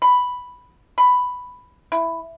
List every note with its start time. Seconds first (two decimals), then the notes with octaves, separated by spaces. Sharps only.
0.02 B5
0.98 B5
1.92 E4